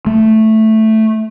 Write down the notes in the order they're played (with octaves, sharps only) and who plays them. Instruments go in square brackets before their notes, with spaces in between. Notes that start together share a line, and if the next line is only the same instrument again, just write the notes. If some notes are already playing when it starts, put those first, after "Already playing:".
[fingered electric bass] A3